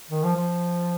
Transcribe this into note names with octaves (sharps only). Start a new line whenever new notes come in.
D#3
F3
F3